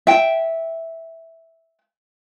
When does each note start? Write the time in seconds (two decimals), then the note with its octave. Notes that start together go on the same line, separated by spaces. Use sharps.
0.07 E5 G5